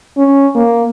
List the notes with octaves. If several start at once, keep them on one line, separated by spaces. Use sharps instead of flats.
C#4
A#3